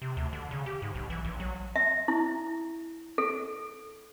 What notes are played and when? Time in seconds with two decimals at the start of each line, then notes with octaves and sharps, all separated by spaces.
0.02 C3
0.17 D2
0.33 D3
0.51 C#3
0.66 G4
0.82 G#2
0.95 B1
1.10 E3
1.25 A#1
1.40 F#3
1.76 E5
2.08 E4
3.18 A4